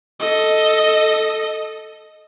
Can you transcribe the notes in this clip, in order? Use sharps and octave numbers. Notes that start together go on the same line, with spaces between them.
A4 D#5